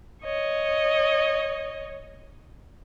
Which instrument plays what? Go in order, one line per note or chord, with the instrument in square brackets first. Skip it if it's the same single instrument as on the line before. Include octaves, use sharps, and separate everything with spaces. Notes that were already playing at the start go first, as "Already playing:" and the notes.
[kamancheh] C#5 D#5